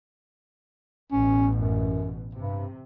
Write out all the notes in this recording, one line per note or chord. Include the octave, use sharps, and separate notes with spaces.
A1 B2 C#4
F#2
G2 C3